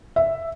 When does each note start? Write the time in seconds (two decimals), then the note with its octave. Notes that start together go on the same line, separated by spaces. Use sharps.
0.16 E5